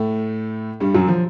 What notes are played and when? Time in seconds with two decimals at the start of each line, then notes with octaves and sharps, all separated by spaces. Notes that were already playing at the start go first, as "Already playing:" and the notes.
Already playing: A2 A3
0.80 G2 G3
0.94 F#2 F#3
1.08 F3